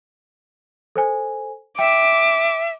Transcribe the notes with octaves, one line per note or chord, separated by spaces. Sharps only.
A4 C5 G#5
E5 G5 D6